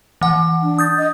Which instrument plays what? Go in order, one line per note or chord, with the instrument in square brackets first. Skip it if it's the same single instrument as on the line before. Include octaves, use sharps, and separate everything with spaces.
[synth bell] E3 F#5
[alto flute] D4
[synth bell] D#6 G6 A6
[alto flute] D#5